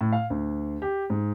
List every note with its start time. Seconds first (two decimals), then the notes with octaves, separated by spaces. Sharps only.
0.01 A2
0.12 F5
0.30 D2
0.82 G4
1.10 G#2